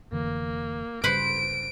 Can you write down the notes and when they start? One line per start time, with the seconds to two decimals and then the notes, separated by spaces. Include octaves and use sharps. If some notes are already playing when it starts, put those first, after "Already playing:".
0.12 F1 D3 E3 A#3
1.04 G1 C#3 G3 B4 C5 B5 D7